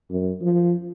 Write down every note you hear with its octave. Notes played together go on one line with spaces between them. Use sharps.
F#2
F3